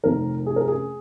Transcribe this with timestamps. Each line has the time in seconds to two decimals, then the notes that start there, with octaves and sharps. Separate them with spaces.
0.03 F1 F2 D#3 A#4
0.46 G#4
0.56 A#4
0.68 G#4